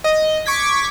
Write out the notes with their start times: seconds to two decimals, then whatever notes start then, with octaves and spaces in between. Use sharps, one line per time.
0.04 D#5
0.46 C#6 D6 G#6 B6